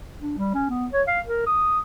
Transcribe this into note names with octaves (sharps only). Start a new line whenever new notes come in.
D4
G3
C#4
B3
C#5
F5
A#4
D#6